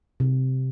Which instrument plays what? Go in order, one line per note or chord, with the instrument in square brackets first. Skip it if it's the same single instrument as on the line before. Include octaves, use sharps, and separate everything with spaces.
[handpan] C3